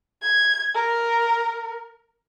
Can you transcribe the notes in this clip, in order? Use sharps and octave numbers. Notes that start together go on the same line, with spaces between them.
G#6
A#4